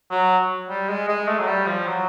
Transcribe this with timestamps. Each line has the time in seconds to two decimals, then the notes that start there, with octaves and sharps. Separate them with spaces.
0.10 F#3
0.69 G3
0.88 G#3
1.08 G#3
1.27 A3
1.39 F#3
1.47 G3
1.66 F3
1.87 F#3